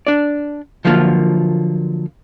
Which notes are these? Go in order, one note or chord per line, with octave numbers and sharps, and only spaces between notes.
D4 D5
D3 F3 F#3 A#3 F4